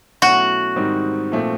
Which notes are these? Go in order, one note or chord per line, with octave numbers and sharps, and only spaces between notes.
B2 F#3 A3 C#4 E4 F#4
G#2 D#3 G3 C4 D#4
A#2 F3 A3 C4